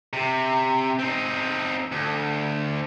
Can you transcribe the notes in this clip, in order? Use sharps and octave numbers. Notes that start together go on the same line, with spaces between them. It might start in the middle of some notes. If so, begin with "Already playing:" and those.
C3
C4 D#4
D2